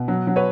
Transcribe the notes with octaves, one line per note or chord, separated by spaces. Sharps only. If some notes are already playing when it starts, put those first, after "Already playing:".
Already playing: B2
F#3
F#3
B4 C#5